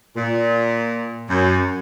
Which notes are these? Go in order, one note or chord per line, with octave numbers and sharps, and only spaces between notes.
A#2
F#2